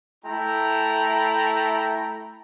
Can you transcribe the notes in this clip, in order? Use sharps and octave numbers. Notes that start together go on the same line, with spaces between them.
A3 E4 G5 A#5